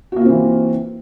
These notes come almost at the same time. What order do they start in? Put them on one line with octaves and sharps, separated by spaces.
F#4 A#3 F4 C4 E3